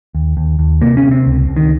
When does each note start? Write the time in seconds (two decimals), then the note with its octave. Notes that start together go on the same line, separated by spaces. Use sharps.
0.15 D#2
0.37 D#2
0.59 D#2
0.81 C3 A#3
0.97 C#4
1.03 C3
1.11 C4
1.27 C#2
1.49 C#2
1.57 D#3